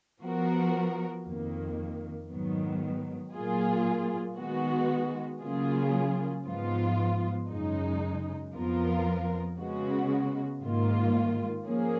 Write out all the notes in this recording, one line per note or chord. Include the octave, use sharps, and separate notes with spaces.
F3 B3 F#4 A#4
F2 D#3 A#3
G#2 D#3 F#3 B3
A#2 F#3 A#3 F4 G#4
D#3 G#3 B3 F#4
C#3 F#3 A#3 F4 G#4
G#2 F3 B3 F4
F#2 C#3 G#3 D#4
F2 F3 B3 F4 A#4
C#3 G#3 B3 F#4
G#2 D#3 A#3 F4
F3 A#3 C#4 G#4